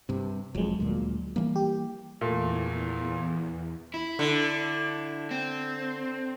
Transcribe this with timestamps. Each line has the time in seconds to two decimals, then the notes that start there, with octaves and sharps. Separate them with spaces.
0.09 G2 C3
0.55 E1 F2 F#3 G#3
0.80 D2 A#2
1.36 E3 G3 A#3
1.56 G4
2.21 E2 A#2 A3
3.94 E4
4.19 D3
5.31 C4